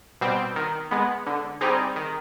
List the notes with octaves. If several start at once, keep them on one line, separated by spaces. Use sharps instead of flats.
B2 G3 C4
D#3
G#3 B3
D3
G3 C4 D#4 G#4
D#3